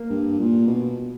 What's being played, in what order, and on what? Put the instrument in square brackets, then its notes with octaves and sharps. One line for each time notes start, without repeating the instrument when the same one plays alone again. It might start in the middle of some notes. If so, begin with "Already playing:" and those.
Already playing: [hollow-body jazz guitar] A#3
[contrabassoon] G2
A#2
B2